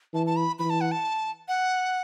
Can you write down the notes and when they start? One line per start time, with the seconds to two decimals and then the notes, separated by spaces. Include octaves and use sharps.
0.13 E3 A5
0.26 A5
0.36 B5
0.59 E3 B5
0.70 A5
0.81 F#5
0.92 A5
1.48 F#5